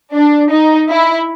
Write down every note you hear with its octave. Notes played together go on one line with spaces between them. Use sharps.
D4
D#4
E4